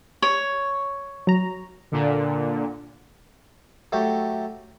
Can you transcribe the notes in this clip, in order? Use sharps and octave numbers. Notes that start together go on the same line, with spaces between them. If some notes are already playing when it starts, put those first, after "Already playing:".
C#5
F#3 A#5
A#2 D3
F#3 A3 G4